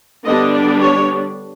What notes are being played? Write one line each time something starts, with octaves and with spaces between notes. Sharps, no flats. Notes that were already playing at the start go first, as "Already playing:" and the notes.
D3 G3 B3 D4 D#5
D5
C#5